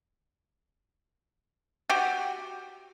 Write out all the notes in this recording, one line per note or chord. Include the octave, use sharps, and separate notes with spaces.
F#4 G4